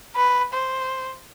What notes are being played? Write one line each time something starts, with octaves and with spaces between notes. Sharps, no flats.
B4
C5